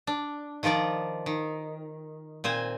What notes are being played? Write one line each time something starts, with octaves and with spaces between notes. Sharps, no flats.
D4
D#3 F3 F4 D5 A#5
D#3
A#2 C4 C5 G#5